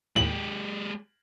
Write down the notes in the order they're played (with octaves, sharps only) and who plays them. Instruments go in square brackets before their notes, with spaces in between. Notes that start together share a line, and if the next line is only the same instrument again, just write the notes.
[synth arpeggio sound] D#2 A2 [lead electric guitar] G#3 G4 [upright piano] F#7